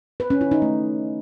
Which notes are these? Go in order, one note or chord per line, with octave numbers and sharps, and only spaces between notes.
B4
C#4
E4
D#4
A3